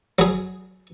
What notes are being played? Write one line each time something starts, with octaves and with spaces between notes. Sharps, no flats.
F#3 G#4